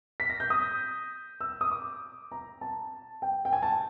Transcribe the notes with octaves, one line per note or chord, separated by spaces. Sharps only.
B6
A#6
G6
D#6
E6
D#6
D6
A#5
A5
G5
G5
G#5
A5